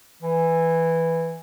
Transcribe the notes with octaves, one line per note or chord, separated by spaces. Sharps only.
E3